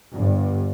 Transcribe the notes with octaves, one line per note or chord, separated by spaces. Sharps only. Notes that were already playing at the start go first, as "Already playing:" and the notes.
G1 G2